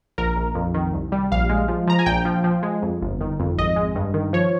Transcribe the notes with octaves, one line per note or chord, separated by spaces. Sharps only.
A#1 A#4
A#1
F2
D#3
C2
G3
A#1 F5
G#3
F3
F3 A#5
G#5
A#1 G5
F3
F3
G#3
F2
G1
D#3
F2
G#1 D#5
G#3
G2
D#3
F3 C#5